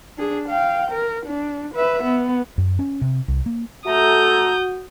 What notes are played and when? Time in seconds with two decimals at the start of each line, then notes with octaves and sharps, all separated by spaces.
0.18 D4 G#4
0.49 F5 G5
0.91 A#4
1.26 D4
1.75 B4 E5
2.03 B3
2.58 F#2
2.79 C#4
3.02 C3
3.28 C2
3.46 A#3
3.86 A3 F#4 A4 A#5 D#6 G6